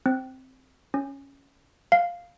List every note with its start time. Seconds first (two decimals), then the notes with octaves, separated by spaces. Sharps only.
0.06 C4
0.94 C#4
1.92 F5